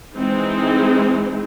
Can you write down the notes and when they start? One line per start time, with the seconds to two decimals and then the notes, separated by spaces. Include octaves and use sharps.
0.14 E3 G#3 C4 D#4